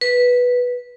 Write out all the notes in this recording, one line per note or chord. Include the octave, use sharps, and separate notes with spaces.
B4